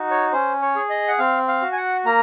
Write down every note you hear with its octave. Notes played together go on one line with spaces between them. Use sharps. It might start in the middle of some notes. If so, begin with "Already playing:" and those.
Already playing: D#4 F#4
C#5
C#4 C5
C#5
G#4
D#5
F#5
C4 F5
F5
F#4
G#5
F#5
A#3 A#5